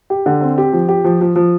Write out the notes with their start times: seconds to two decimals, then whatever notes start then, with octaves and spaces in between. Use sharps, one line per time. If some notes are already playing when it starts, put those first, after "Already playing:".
0.10 G4
0.26 D3
0.41 C4
0.58 G4
0.73 F3
0.89 G4
1.04 F3
1.21 F3
1.36 F3